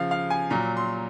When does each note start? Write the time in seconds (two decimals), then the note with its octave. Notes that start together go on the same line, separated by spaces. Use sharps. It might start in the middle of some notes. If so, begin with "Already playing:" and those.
Already playing: C#3 F3 F5
0.11 F5
0.30 G#5
0.50 A#2 F#3 A#5
0.77 C6